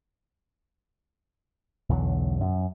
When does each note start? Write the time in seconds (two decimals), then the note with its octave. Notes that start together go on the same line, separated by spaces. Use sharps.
1.89 B1 E2 D3 F#3
2.41 F#2